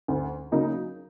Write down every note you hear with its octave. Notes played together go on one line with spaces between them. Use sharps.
D2
C#3 F#3 A#3 D#4